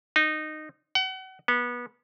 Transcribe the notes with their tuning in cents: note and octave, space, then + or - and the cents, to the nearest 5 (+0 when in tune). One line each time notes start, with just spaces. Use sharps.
D#4 -15
F#5 +35
B3 -25